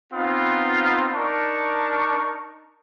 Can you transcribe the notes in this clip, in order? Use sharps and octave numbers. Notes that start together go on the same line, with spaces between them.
B3 C4 D#4 F4
D4 D#4 A#4 A5 C#6